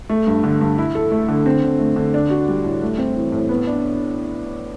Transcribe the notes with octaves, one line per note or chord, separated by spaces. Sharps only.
A3
G2
D3
G2
E4
A4
A3
D3
C4
D3
A3
D3
D4
F#4
G3
A2
A3
C4
E3
A2
B3
D4